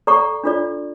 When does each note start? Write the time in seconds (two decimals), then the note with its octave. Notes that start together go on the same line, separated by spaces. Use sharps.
0.07 A4 D5 F#5 A#5 C#6
0.44 D4 F4 A4 D5